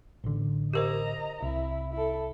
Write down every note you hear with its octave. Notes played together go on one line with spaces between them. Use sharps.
A1 D3
G4 A#4 C5 D#5 A#5
C2 E4
E4 A4